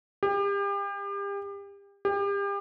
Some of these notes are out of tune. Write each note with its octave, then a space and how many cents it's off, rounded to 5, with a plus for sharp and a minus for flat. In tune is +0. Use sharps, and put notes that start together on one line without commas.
G4 +35
G4 +35